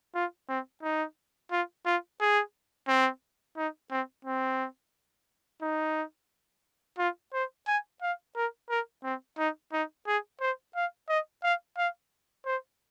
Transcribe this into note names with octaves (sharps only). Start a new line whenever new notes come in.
F4
C4
D#4
F4
F4
G#4
C4
D#4
C4
C4
D#4
F4
C5
G#5
F5
A#4
A#4
C4
D#4
D#4
G#4
C5
F5
D#5
F5
F5
C5